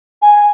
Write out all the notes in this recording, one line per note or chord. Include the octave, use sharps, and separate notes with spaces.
G#5